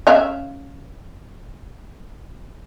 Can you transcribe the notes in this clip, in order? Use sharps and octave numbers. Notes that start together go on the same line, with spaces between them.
C#4 E5 F5